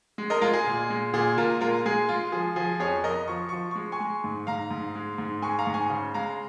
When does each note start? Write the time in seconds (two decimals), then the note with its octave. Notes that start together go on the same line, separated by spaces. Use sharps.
0.18 G#3
0.30 A#4 D#5
0.41 G#3 F4 A#4
0.53 G#4
0.66 A#2
0.90 G#3
1.14 A#2 G#4
1.37 A#2 F4 A#4
1.61 G#3 F4 A#4
1.86 G#3 G#4
2.08 G#3 F4
2.32 F3 G#4
2.56 F3 G#4
2.80 F2 G#4 C#5
3.04 F2 A#4 D#5
3.28 F3 C#6
3.49 F3 C#6
3.71 G#3 C#6
3.92 G#5 C#6
4.00 G#3
4.24 G#2
4.47 G#2 F5 A#5
4.71 G#2
4.95 G#3
5.18 G#2
5.42 G#3 G#5 C#6
5.59 F5 A#5
5.67 G#2
5.74 G#5 C#6
5.90 C#3
6.14 G#3 F5 A#5